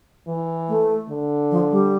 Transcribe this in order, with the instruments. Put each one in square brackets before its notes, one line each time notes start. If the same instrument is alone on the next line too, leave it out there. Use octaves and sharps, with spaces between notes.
[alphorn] E3
[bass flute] A3
[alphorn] D3
[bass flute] F3
G3